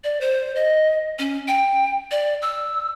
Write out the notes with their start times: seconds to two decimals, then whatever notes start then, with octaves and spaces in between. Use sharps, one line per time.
0.04 D5
0.21 C5
0.56 D#5
1.19 C#4
1.48 G5
2.11 D5
2.42 E6